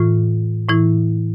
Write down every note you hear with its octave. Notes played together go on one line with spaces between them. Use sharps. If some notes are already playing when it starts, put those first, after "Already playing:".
Already playing: A2 E3 F4
A2 E3 E4